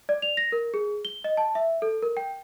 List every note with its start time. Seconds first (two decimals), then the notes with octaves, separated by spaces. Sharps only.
0.09 D5
0.22 F7
0.37 A#6
0.52 A#4
0.74 G#4
1.05 G7
1.24 D#5
1.37 A5
1.55 E5
1.82 A4
2.03 A#4
2.17 G5